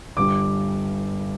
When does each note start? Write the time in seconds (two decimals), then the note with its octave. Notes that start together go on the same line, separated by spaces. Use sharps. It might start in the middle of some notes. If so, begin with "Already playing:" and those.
0.17 G1 G2 G3 D6